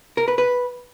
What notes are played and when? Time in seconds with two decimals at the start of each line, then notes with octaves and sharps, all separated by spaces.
0.17 A#4
0.28 B4
0.38 B4